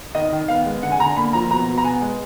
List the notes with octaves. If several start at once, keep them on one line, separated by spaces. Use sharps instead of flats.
D#3 D#5
D#3
B3 F5
G#3
D3 F#5
G#5
D3 A#5
A#3 B5
F3 A#5
B2 A#5
B2
A#5
B3 G#5
G#3